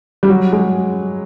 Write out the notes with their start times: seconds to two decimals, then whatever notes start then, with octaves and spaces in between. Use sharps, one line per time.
0.23 G3
0.29 F#3
0.53 G#3